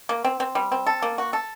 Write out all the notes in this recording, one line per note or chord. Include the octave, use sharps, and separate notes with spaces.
A#3
C4
C4
G3
C4
A4
A#3
F#4
A4